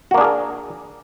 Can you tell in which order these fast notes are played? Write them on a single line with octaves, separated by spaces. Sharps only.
F#4 A#3 D4 G#4 A#4